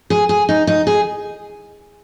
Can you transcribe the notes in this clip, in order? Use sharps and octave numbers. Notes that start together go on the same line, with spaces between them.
G#4
G#4
D#4
D#4
G#4